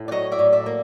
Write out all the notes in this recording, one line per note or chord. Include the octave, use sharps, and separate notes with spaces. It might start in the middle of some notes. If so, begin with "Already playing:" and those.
Already playing: A2
D5
F#3 C#5 D#5
D5 E5
A2
D5 E5
A#3